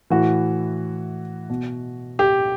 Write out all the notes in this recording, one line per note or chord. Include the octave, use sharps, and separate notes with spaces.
A2 E3 F#4
B2
G4